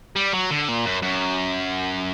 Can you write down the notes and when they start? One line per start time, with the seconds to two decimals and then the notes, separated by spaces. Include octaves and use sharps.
0.16 G3
0.33 F#3
0.51 D3
0.68 A#2
0.85 F#2
1.02 F#2